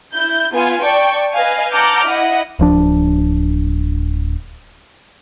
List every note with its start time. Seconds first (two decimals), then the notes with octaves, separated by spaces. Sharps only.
0.15 E4 G6
0.55 B3 F4 G#5
0.83 D5 G5 A5 C#6
1.33 B4 D#5 F5 G#5
1.74 F#5 A5 A#5 D6 F6 G6
2.05 E4 D#5 F#5
2.59 D1 F3 D4